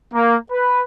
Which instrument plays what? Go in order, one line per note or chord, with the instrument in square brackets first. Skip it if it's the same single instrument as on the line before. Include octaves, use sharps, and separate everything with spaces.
[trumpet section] A#3
B4